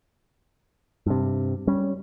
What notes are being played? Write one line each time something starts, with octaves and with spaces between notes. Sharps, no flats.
G2 C3
G3 C#4